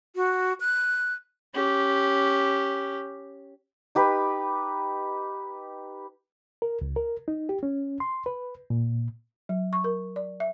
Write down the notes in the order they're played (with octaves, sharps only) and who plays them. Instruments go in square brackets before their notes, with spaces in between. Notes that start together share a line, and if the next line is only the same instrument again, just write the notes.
[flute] F#4
F#6
[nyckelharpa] C#4 G4
[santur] D#4 G4 B4
[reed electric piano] A#4
C#2
A#4
D#4
G4
C#4
C6
B4
A#2
[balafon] F#3
C#6
A#4
D5
E5